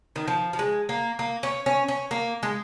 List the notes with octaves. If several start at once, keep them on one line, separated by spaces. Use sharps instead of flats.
D#3
F3
F3
G#3
A#3
A#3
C#4
C#4
C#4
A#3
G#3